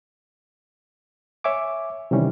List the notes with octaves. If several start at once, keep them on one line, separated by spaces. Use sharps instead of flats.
C#5 E5 G#5 D6
C3 D#3 E3 G3 C#4